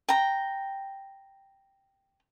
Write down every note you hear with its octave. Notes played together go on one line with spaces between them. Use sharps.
G5 A#5